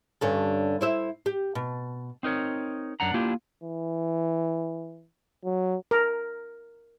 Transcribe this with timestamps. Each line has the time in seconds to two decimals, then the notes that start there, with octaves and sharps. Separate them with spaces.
0.21 G2 D3 C#4
0.81 E4 C5 E5
1.26 G4
1.55 B2
2.23 C4 D#4 A#4 C#5
3.00 F#2 D4 F#5 A#5
3.14 A#3 D4 E4 F4 G4
3.63 E3
5.45 F#3
5.91 A#4